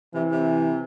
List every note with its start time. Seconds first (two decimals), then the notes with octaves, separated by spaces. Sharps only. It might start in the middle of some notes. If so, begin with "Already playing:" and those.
0.14 C3 E3
0.31 C3